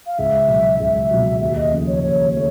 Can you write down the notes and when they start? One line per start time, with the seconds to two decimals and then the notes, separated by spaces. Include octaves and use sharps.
0.07 F5
0.18 C#2 E5
0.48 B2 F#3
0.79 C#2 E5
1.10 B2 F#3
1.41 D#2 E5
1.57 D#5
1.71 C#3 F3 A3
1.87 C#5
2.02 D#2 C#5
2.33 C#3 F3 A3 C#5